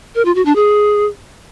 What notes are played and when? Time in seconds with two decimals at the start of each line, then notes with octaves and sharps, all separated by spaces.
0.15 A#4
0.25 F4
0.35 F#4
0.45 D4
0.55 G#4